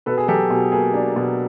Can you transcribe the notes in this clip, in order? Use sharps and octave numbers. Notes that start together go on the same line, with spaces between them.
B2 A4 B4
G#4
F#3 G4 A4
B2 G#4
A#3 G#4
D4
B2